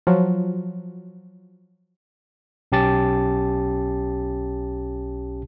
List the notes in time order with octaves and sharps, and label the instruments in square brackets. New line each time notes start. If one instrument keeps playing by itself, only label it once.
[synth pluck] F3 F#3
[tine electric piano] B1 C#4 G4 A5 A6